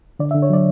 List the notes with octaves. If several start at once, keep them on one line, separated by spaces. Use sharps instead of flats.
D3 D5
E5
D3
C#5
F#3 D5